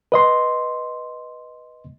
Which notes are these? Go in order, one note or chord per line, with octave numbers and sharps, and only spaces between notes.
B4 D#5 C6